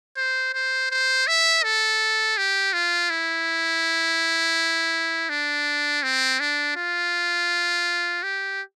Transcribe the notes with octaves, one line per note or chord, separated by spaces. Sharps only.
C5
C5
C5
E5
A4
G4
F4
E4
D4
C4
D4
F4
G4